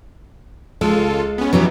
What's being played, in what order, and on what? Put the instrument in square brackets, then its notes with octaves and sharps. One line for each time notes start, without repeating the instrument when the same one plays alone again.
[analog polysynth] C#2 F4 A4 [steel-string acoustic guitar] G#3
[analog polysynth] B3 C#4
[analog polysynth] B2 E3 B3 [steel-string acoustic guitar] F#3 C#4 G4